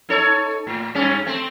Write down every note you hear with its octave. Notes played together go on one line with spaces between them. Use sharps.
D#4 A4 C#5
A2
G2 C#4
A3 C4